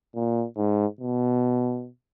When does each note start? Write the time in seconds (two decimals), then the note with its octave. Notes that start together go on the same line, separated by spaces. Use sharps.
0.15 A#2
0.57 G#2
1.00 B2